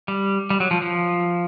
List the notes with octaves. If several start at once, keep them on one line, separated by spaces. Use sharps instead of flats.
G3
G3
F#3
F3
F3